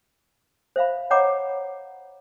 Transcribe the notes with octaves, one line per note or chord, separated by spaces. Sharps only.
C5 E5 F5 B5
C#5 D#5 F#5 A#5 B5 D6